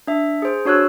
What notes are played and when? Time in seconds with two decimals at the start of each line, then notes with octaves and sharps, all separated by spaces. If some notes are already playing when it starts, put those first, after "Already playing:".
0.07 D4 E5
0.42 G#4 C5
0.65 D4 F#4 C#5 E6 F#6